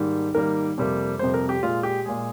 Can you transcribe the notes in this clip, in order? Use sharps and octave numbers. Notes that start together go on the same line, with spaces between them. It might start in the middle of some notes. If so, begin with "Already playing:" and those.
Already playing: G#2 D#3 G3 A#3
G#2 D#3 G3 A#3 A#4
F2 C3 G3 A#3
F2 C3 G3 A#3 C5
A#4
G4
A#2 G#3 F4
G4
A#2 G#3 G#4